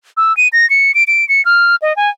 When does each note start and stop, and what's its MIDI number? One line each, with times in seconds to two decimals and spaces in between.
0.17 0.35 88
0.37 0.48 99
0.52 0.68 94
0.70 0.94 97
0.94 1.04 98
1.07 1.27 98
1.29 1.44 97
1.45 1.76 89
1.82 1.96 75
1.96 2.10 80